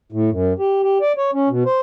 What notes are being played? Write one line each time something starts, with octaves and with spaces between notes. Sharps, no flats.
A2
F#2
G4
G4
D5
C#5
C#4
B2
C5